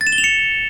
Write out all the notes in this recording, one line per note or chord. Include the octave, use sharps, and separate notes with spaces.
A6
E7
G7
F7
C#7